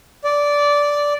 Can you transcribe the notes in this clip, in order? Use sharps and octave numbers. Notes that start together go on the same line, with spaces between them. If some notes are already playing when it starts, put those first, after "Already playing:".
D5